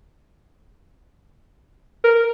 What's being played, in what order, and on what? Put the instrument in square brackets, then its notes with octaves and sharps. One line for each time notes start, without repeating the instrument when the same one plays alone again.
[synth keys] A#4